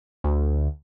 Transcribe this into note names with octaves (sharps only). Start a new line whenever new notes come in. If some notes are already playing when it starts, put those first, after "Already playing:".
D2